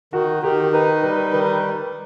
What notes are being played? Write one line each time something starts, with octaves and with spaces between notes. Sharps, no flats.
D#3 F#4
D#3 G4
D#4 B4
G3 B4
D#3 B4